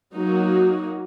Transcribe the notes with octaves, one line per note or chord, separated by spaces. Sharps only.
F#3 A#3 D#4 F#4